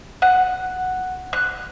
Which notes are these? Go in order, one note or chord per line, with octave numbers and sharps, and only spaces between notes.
F#5
F#6